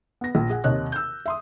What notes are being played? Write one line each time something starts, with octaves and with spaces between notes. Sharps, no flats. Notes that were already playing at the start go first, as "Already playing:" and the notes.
B3 A#6
A#1
G#4 F#5
D#2 C3 C#5 D#5 F#6
E6 G6
E5 C6 D#6